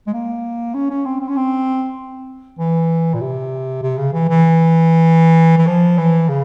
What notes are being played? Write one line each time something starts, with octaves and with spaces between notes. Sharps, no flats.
G#3
A#3
C#4
C#4
C4
C4
C#4
C4
E3
A#2
C3
C3
C#3
E3
E3
E3
F3
E3
C#3